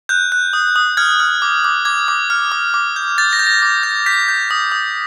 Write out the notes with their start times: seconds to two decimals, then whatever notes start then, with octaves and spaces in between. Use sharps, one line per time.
0.09 F#6 G6
0.32 F#6
0.53 D#6
0.76 D#6
0.97 F6 G#6
1.20 F6
1.42 D6
1.64 D6
1.85 D6 G#6
2.08 D6
2.30 F6
2.52 D6
2.74 D6
2.96 G6
3.18 G6 A6
3.33 A#6
3.39 G6
3.47 A#6
3.62 D6
3.83 G6
4.06 G6 B6
4.28 G6
4.51 D#6
4.72 D#6